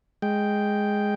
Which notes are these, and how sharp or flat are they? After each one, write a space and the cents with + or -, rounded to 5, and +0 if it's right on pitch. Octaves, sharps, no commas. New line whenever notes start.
G#3 +0 G5 +0